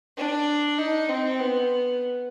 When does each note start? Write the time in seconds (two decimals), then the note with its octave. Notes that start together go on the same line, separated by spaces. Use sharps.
0.18 D4
0.79 D#4
1.09 C4
1.39 B3